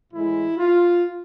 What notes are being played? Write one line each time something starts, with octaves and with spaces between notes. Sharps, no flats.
A2 E3 G#3 E4
F4